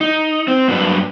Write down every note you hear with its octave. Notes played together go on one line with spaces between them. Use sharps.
D#4
C4
G2 F#3 A#3 D4 G4 B4